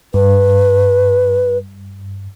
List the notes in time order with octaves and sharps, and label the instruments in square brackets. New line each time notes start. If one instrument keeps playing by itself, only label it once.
[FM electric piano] G2 [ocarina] B4